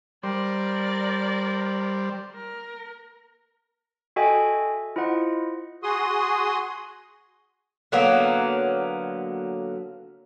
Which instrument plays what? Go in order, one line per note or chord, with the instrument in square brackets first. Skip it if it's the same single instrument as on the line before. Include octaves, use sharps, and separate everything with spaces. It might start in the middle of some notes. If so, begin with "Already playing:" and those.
[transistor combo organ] G3 C5 [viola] A#4 D5
[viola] A#4
[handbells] F#4 A4 D#5 E5 G5 G#5
E4 F4 C5 D#5 F#5
[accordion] F#4 G#4 C6 D#6
[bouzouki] D3 F#3 A#3 B3